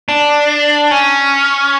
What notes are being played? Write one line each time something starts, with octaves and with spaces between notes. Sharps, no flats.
D4
C#4